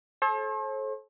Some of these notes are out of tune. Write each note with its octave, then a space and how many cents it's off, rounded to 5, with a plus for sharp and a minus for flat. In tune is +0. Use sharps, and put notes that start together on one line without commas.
A4 -30 C5 +45